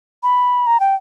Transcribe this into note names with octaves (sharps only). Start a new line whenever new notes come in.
B5
A#5
G5